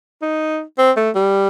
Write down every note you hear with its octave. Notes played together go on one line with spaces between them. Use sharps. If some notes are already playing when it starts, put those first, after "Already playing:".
D#4
C4
A3
G3